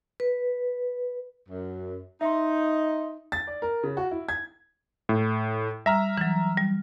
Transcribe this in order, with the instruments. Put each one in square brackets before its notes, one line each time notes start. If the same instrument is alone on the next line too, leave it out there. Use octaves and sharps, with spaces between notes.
[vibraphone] B4
[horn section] F#2
[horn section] D#4 [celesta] E5 C6
[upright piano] A6
D5
A#4
C#3
F#4
E4
G#6
[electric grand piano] A2
[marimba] G3 [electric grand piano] E5 A#5 F6
[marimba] E3 F#3
G3